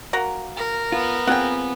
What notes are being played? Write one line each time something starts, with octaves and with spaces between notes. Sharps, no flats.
A#3 F#4 A#5
A#4
B3 F4
C4 F4 G#4 F#5 G5